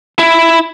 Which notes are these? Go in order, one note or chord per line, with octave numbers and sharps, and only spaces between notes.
E4